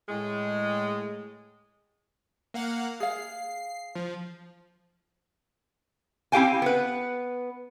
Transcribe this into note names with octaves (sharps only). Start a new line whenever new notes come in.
A2 G#3
A#3 F5 F#5
G#4 F5 C7
F3
C4 E4 G4 F5 G5 G#5
B3 B4